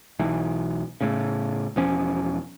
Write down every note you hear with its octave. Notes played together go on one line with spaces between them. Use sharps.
B1 E3
A2 C#3
E1 F3 C#4